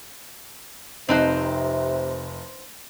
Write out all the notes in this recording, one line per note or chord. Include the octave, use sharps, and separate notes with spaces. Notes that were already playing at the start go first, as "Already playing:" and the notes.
F1 C3 C4 D#4 C5 A5 F#6